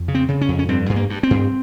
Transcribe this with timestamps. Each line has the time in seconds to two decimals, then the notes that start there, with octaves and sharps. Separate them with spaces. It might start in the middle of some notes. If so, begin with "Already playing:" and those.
Already playing: F2
0.08 C#3
0.15 C4
0.28 C#3
0.41 C#4
0.48 F2
0.59 C#4
0.69 G2 C4
0.89 G2
0.96 A#3
1.10 G2
1.23 C4
1.31 G2